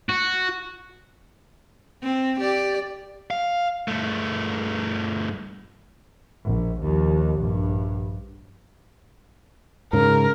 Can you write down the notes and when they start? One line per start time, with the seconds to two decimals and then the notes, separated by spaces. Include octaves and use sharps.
0.09 F#4
2.03 C4
2.40 G4 D5
3.31 F5
3.88 G2 A3
6.44 A#1
6.81 D#2 F3
7.40 A#1 G2
9.93 G#2 C#3 A#4